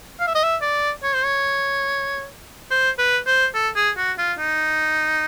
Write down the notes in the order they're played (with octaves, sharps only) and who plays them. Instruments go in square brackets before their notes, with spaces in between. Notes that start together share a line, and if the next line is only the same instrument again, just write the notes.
[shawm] F5
E5
D#5
E5
D5
C#5
C5
C#5
C5
B4
C5
A4
G#4
F#4
F4
D#4